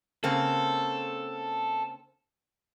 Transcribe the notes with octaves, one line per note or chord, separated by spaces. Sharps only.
C#3 A#3 C4 A4